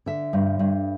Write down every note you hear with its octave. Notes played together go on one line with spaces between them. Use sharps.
D3 E5
G2
G2